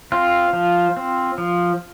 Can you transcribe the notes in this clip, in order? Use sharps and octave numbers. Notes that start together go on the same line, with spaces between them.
C4 F4
F3
C4
F3